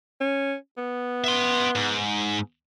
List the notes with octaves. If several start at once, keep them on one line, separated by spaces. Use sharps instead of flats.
C#4
B3
E5 C6
G#2